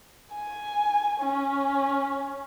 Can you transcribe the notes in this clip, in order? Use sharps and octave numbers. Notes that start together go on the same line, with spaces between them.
G#5
C#4